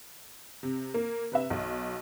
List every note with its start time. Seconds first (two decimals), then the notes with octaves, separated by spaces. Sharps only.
0.63 C3
0.94 A#3
1.32 C3 B4 E5
1.50 B1